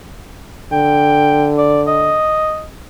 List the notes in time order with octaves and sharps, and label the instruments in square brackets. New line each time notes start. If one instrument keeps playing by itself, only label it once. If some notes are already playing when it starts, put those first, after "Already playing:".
[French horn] D3 [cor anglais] G5
[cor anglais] D5
D#5